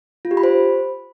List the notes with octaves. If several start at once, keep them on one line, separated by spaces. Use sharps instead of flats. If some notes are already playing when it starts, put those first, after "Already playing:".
F4
G4
B5
C5